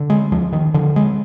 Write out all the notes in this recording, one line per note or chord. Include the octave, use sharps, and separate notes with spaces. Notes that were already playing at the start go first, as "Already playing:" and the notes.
Already playing: D3
G#3
D2 F3
D#3
D3 F3
G#3